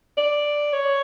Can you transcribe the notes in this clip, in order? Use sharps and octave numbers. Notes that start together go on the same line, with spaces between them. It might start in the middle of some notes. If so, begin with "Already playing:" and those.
D5
C#5